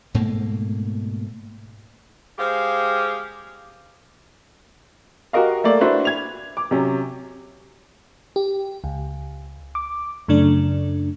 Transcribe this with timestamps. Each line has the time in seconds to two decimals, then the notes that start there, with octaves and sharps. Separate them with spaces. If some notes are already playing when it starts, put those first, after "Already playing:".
0.14 G#2 B2 A3 A#3
2.38 G#3 G4 G#4 C5 F5
5.33 F#4 G4 A#4 D#5 F5
5.64 A3 A#3 D5
5.81 D4 E4 F#4 B4 C5
6.05 G#6 F7
6.57 D6
6.71 C3 F#3 C#4
8.36 G4
8.84 C#2
9.75 D6
10.28 F#2 C#3 A3 D4